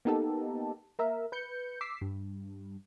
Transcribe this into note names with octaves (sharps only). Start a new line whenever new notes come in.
A#3 B3 D#4 G4 A4
A#3 A#4 E5
B4 G6 C#7
D6 E6 B6 C7
G2